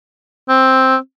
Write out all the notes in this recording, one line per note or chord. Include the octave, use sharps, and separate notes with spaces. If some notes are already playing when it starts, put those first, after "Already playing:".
C4